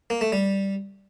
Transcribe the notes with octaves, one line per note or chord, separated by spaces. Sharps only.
A#3
A3
G3